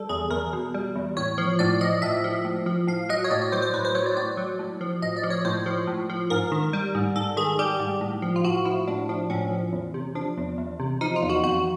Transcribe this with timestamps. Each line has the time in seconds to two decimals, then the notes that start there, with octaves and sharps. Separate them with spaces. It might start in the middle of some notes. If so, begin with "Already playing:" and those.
Already playing: G3 A4
0.09 E2 G#4
0.31 E2 A#4
0.53 B2
0.74 G3
0.96 E2
1.17 A2 C#5
1.38 F3
1.59 A2 D5
1.81 F3 D#5
2.02 A2 E5
2.24 F3
2.45 A2
2.66 F3
2.87 A2 F5
3.09 F#3 D#5
3.24 C#5
3.31 A2 D5
3.42 D5
3.52 F#3 C5
3.62 C5
3.74 A2 B4
3.85 C5
3.95 F#3 C#5
4.06 D5
4.17 A2 D5
4.37 F#3
4.59 A2
4.81 F3
5.02 A2 D#5
5.17 D5
5.23 F3
5.30 C#5
5.45 A2 C5
5.66 F3
5.87 A2
6.10 F3
6.30 G#2 A#4
6.52 D#3
6.73 G3
6.95 G#2
7.16 G#2 A4
7.37 D#3 G#4
7.59 G3 G4
7.80 G#2
8.01 A2
8.22 F3
8.36 F4
8.44 A2 F#4
8.66 F3 E4
8.87 A2 D4
9.09 F3 D4
9.30 A2 C#4
9.51 F3
9.73 E2
9.94 C3
10.15 F3 D4
10.37 E2
10.58 E2
10.80 C3
11.01 F3 D#4
11.16 F4
11.23 E2
11.29 F#4
11.44 F2 F#4